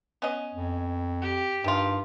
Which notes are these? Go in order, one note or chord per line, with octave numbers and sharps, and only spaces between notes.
B3 C#4 D#5
F2
G4
G2 D#3 F4